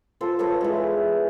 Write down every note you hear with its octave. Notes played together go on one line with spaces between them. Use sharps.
F4 A4 C5
A4 B4 C#5 D#5
E3 G#3